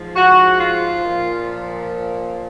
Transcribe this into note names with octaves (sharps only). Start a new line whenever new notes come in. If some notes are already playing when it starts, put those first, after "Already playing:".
Already playing: G#2 F3
F#4
F4
A#2 F3